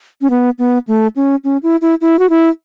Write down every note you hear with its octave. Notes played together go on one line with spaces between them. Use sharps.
C#4
B3
B3
A3
C#4
C#4
E4
E4
E4
F#4
E4